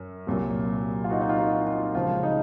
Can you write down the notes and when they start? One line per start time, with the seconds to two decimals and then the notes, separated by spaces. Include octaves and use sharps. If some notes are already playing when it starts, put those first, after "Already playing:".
Already playing: F#2
0.27 C2 A#2 F#3
1.04 F4
1.10 D#4 F#4
1.21 D#4
1.29 F4
1.38 D#4 F#4
1.67 F4
1.95 C#2 C#3 F3 F4
2.23 D#4